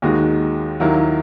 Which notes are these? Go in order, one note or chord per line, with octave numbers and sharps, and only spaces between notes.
D#2 D#3 G#3 D#4 F#4
D#2 D#3 F#3 A#3 E4